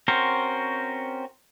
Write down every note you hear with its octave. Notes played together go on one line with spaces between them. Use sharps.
C4 C#4 F#4 A#4 C5